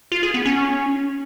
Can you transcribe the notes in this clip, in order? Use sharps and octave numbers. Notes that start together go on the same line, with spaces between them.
F4
G#4
B3
C#4